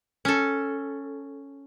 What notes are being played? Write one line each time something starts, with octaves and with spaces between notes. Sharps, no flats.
C#4 A4